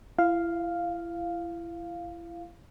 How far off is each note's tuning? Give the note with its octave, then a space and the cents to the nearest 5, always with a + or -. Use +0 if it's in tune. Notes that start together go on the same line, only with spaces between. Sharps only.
E4 +35 F5 +0